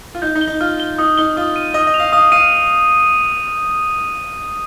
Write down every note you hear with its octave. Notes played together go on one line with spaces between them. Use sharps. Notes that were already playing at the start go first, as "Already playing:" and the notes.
F4
D#4 G6
D#4
G7
D#4
F4 F6
G7
D#4 D#6
D#4 G7
F4 D#6
D#7
D#5 D#6
D#5
F7
F5
F5 D#6
F5 D#7